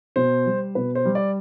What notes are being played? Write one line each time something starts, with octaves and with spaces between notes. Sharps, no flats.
B2 C5
G3
B2 B4
C5
G3
D5